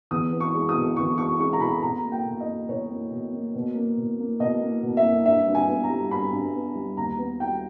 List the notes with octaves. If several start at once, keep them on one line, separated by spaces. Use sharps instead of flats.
E2 D#6
B3
C#6
G#3
D#6
B2
E2 C#6
B3 C#6
G#3 C#6
A#5
B2 B5
B2 A#5
A#3
G5
B2
D#5
A#3
B2 C#5
A#3
B2
A#3
B2
A#3
B2
A#3
B2 D#5
A#3
B2
E5
A#3
G2 E5
G2
G#5
B3
A#5
G3
G2 B5
G2
B3
G3
D#2 A#5
B3
G3 G5